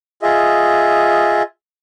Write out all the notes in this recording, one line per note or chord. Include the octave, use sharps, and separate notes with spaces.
F4 G#4 D#5 E5